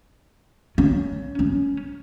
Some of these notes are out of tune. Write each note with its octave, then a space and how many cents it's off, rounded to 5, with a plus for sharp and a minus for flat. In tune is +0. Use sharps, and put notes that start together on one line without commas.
C#4 +20
C#4 +10